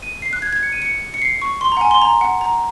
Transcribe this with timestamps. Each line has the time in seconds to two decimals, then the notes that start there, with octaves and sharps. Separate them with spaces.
0.02 D#7
0.22 C7
0.33 F#6
0.42 G#6
0.47 F#6
0.53 G#6
0.63 C#7
0.72 D#7
0.82 C#7
1.14 C#7
1.22 C7
1.42 C#6
1.61 C6
1.72 F#5 A#5
1.81 G#5
1.91 C6
2.02 A#5
2.21 F#5
2.41 A#5